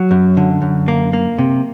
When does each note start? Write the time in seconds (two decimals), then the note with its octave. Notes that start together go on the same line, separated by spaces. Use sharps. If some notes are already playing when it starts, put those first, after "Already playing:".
Already playing: F#3
0.11 F#2
0.37 D3
0.62 F#2
0.88 A#3
1.13 A#3
1.38 C3